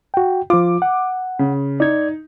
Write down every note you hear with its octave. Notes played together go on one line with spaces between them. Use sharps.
F#4 G5
F3 F4 D6
F#5
C#3
D#4 D5 G#6